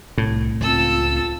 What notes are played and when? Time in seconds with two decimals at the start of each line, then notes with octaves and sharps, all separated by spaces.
0.18 C2 A2
0.61 C#2 C4 F4 A4 E6